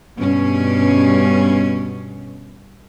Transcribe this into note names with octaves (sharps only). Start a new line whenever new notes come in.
G2 B2 C#4